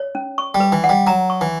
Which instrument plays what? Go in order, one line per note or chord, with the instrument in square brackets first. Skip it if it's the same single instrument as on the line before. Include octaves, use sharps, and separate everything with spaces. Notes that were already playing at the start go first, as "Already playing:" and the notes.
Already playing: [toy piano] C#5
C#4
C#6
[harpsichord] G3
[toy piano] B4
[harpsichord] E3
[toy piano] F#5
[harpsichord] G3
[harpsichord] F#3 [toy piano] A#5
[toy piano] C#6
[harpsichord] E3